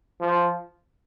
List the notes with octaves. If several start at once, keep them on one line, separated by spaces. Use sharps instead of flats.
F3